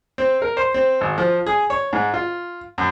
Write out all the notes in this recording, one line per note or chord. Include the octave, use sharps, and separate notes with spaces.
C4
A#4
C5
C4
G#1
F3
G#4
C#5
G#2
F4
F#2